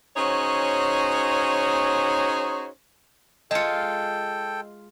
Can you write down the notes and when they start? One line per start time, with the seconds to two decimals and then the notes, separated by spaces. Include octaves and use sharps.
0.17 C#4 D#4 F#4 G#4 C5 C#5
3.51 G#3 F4 A4 D#5 G5 C#7